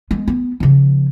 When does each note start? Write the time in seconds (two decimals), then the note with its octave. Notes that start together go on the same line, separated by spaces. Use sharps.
0.11 G#3 B3
0.28 B3
0.60 C#3 F3